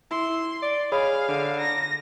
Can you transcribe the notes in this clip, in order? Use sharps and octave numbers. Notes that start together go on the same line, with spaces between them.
E4 C6
D5
G#4 C#5 D#5 F5 B5
D3
A#5 A#6